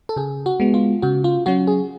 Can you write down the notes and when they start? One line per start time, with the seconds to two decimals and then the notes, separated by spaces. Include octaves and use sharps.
0.09 A4
0.17 C#3 G#4
0.46 F#4
0.60 G#3 B3
0.74 F4
1.02 C#3 F#4
1.24 F4
1.46 F#3 C#4 F#4
1.67 G#4